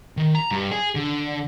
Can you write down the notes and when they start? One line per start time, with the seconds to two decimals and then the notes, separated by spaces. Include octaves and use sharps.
0.17 D#3
0.35 A#5
0.51 G2
0.71 G#4
0.95 D3